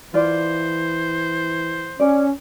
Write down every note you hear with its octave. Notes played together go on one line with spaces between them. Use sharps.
E3 F4 C5 D5
C#4 D5